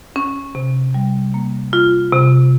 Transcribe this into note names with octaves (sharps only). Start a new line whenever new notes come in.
C#4
C3
G3
A#3
F4
C3